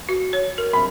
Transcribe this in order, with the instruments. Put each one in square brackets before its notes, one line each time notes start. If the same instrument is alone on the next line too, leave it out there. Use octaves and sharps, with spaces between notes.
[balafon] F#4
C#5
A#4
[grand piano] B5